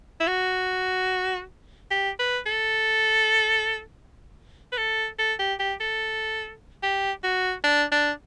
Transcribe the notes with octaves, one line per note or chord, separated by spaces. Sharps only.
E4
F#4
G4
B4
A4
B4
A4
A4
G4
G4
A4
G4
F#4
D4
D4